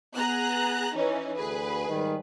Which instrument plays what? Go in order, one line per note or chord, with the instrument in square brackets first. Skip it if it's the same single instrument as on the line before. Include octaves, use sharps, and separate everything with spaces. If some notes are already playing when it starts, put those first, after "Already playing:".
[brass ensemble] B3 [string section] G#4 A#5 F#6
[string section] E3 C#4 D#4
[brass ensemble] D2 [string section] G#4 B4
[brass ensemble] G#2 D#3 G3